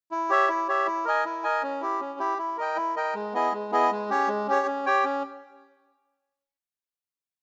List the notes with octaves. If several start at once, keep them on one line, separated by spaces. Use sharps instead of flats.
E4
G4 C#5 E5
E4
G4 C#5 E5
E4
A#4 D#5 G#5
E4
A#4 D#5 G#5
C#4
E4 G4
C#4
E4 G4
E4
A#4 D#5 G5
E4
A#4 D#5 G5
G#3
B3 E4 G#4 D#5
G#3
B3 E4 G#4 D#5
G#3
C#4 G4 C#5
G#3
C#4 G4 C#5
C#4
G4 C#5 G5
C#4